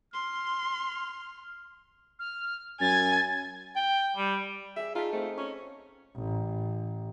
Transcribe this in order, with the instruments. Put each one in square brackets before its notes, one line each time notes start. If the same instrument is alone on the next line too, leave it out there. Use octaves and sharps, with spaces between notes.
[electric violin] C6 [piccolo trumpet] F6
[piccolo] F6
[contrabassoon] F#2 [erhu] G#5 [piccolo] A6
[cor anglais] G5
G3
[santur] G#4 D5 [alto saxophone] E5
[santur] D#4 [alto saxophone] F4 [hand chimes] G#4 A5 B6
[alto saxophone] A3 [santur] C4 [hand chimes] D#5
[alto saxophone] C#4 [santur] A#5 [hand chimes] C#6
[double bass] A1